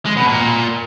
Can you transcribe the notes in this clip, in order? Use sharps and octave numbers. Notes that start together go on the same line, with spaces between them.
G#3
B2
A#2